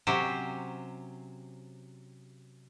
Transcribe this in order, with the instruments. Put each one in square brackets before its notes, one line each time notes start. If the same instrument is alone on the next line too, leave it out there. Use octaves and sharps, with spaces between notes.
[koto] C3 F#3 C#4 G4 C5